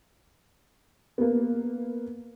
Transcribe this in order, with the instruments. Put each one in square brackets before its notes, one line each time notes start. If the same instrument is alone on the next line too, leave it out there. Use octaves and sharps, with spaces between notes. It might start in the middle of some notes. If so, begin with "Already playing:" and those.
[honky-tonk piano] A#3 B3